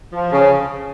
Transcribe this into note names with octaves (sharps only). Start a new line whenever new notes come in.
F3
C#3